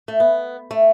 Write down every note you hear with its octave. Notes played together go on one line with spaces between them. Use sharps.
A3
B3
A3